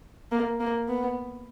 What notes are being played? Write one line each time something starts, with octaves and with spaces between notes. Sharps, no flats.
A#3
A#3
B3